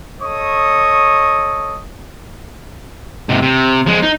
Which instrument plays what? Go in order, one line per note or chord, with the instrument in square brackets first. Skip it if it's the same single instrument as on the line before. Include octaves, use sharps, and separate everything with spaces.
[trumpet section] A4 C#5 D#5 C#6 D#6
[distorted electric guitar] G#2 C3
C3
F3 G#3
D#4